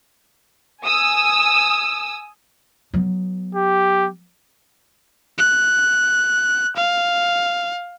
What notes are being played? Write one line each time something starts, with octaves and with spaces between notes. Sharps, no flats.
G#5 D#6 E6
F#3 B3
G4
F#6
F5